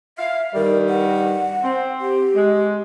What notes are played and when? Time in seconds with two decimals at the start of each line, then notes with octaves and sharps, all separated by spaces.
0.18 E5 F5
0.55 G2 D#3 G3 A#4
0.89 F#5
1.64 C4
2.01 G4
2.35 G#3